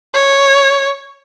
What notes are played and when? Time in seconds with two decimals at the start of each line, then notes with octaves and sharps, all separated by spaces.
0.14 C#5